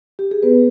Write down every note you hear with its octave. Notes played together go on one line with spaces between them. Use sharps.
G4
G#4
B3 B4